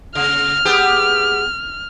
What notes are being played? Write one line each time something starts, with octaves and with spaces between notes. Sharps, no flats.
C#3 F6
B3 G4 G#4